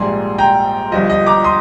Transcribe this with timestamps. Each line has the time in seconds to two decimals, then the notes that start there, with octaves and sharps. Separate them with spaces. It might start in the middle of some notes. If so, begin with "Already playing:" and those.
Already playing: A#1 G#2 G3 A#3 G#5 C6
0.38 G5 A#5
0.92 G1 G2 F3 D#5
1.10 D#5
1.26 A#5 D6
1.44 C6 D#6